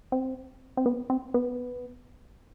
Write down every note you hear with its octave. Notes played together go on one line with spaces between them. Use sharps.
C4
C4
B3
C4
B3